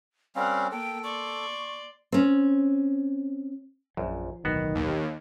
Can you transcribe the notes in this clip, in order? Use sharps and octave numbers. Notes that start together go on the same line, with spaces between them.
G3 C4 C#4 A#4 F5 F#5
A#3 A4 G5
D5 C6 C#6
C4 C#4
A#1 F#2 F3
D1 B1 D#3 B3 F#4
D#2